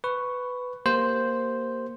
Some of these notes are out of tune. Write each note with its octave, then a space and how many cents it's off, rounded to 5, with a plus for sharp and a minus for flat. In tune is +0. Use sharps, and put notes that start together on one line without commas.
B4 +10 C#6 +0
A#3 +0 G4 +0 C5 +0